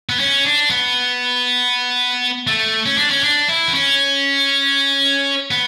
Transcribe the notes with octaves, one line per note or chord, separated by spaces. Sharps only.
B3
C#4
D4
B3
A3
C#4
D4
C#4
D4
E4
B3
C#4
B3